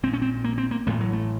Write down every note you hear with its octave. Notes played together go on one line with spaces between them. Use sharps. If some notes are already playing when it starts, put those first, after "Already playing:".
A#1 A#2 C4
C#4
C4
A#3
C4
A#3
A1 A2 A3
F#3
A3